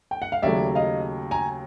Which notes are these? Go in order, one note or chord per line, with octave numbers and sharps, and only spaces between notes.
G5
F#5
F5
D#2 C#3 F#3 A3 D5 E5
D#5 F5
G#5 A#5